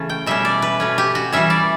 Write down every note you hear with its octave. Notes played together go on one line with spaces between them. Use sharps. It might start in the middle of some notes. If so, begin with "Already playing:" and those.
Already playing: C#3 E3 A3 C#4 A5
G5
B2 G3 C#4 E5
D5
B4
B2 A3 C#4
G4
F#4
E3 G3 C#4 E5
D5